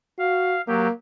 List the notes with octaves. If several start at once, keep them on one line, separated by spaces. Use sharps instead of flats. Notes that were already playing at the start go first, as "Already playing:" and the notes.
F#4 F5
F#3 A#3 G4